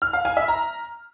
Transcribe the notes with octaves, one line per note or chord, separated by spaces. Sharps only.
F6
F5
G#5
E5
A#5